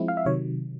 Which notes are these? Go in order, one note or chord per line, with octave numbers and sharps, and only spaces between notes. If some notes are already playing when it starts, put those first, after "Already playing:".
Already playing: F3 G#3 C4 E4
F5
E5
C3 D#3 F#3 C#5